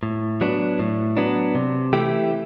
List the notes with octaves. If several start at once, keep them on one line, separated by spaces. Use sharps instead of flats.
A2
F#3 B3 D4
A2
F#3 B3 D4
C3
E3 A3 E4 G4